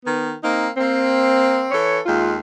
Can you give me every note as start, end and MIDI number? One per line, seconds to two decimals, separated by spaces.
0.05 0.32 51
0.05 0.32 59
0.42 0.68 58
0.42 0.68 60
0.42 0.68 63
0.77 1.66 58
0.77 1.66 60
1.71 1.98 52
1.71 1.98 69
1.71 1.98 73
2.05 2.36 39
2.05 2.36 56
2.05 2.36 65